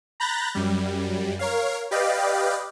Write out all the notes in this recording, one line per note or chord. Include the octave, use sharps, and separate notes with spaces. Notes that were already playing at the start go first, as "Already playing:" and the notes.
A#5 B5 F#6 G6 A6 A#6
F#2 G3
A#4 C#5 F5
G4 B4 D5 D#5 F5 G5